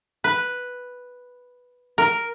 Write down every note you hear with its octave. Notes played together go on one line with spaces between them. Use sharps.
B4
A#4